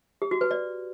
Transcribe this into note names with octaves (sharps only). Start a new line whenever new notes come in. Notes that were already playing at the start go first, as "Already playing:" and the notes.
G4
F#4
B4
D5